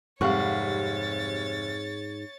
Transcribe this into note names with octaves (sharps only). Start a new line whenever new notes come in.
F1 G#2 G3 C#5 F5 F#5 C#6 A6